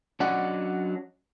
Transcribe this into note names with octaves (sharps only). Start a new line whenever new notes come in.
F#3 C#4 D4 D5 D#5 F#5